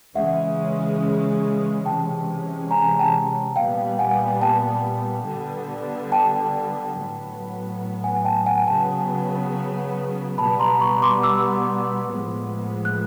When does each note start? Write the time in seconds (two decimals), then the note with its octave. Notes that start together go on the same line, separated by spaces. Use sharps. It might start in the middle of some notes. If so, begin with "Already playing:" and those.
0.15 C#3 E3 G#3 C#4 E5 F#5
1.85 C3 E3 G#3 C#4 G5 A5
2.71 G#5 A#5
2.99 G5 A5
3.56 A#2 G3 B3 F5 G5
3.99 F#5 G#5
4.41 G5 A5
5.26 D3 G3 B3
6.12 G5 A5
6.97 A2 F#3 B3
8.04 F#5 G#5
8.25 G5 A5
8.46 F#5 G#5
8.67 C#3 F#3 B3 G5 A5
10.38 B2 G3 B3 A5 B5
10.59 A#5 C6
10.81 B5 C#6
11.02 C6 D6
11.23 D6 E6
12.09 A2 F3 G#3 B3
12.85 F#6